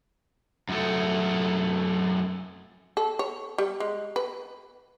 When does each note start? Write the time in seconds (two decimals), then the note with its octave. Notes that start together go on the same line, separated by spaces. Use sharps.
0.69 F#2 A3
2.97 A4
3.19 C#5
3.58 G3
3.80 G#3
4.16 B4